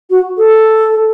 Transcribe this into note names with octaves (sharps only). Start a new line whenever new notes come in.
F#4
A4